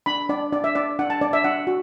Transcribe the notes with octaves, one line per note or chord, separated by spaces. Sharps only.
D4 B5
D4 D5
D4 D5
E5
D4 D5
D4 F#5
A5
D4 D5
E5
D4 F#5
F#4